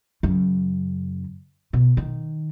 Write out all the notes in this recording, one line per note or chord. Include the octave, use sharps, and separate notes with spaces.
F#2 C#3
B2
D#3